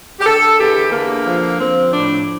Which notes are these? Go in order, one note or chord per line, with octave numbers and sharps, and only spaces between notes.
G4
D3 A4
E2 G4
D3 A#3
F3
F3 C4
A2 D4